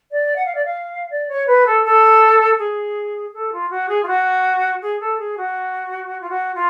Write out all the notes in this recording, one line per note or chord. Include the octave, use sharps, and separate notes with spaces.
D5
F#5
F5
D5
F5
D5
C#5
B4
A4
A4
G#4
A4
F4
F#4
G#4
F4
F#4
G#4
A4
G#4
F#4
F4
F#4
F4